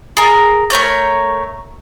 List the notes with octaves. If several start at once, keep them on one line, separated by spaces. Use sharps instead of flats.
G#4 A#4
A3 A#4 C#5 G6